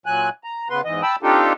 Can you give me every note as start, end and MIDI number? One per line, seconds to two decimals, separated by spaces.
0.06 0.29 46
0.06 0.29 54
0.06 0.29 80
0.06 0.29 90
0.44 0.68 82
0.70 0.81 49
0.70 0.81 59
0.70 0.81 71
0.70 0.81 84
0.85 1.02 40
0.85 1.02 44
0.85 1.02 52
0.85 1.02 75
1.03 1.16 79
1.03 1.16 81
1.03 1.16 83
1.03 1.16 88
1.23 1.53 60
1.23 1.53 62
1.23 1.53 63
1.23 1.53 65
1.23 1.53 67
1.23 1.53 69